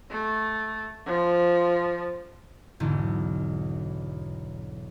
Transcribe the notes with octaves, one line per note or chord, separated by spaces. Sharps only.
A3
F3
B1 E2 G#2 D3 E3